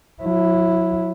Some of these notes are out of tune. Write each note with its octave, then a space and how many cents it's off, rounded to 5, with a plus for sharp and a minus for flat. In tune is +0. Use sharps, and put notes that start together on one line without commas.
F#3 -30 E4 +0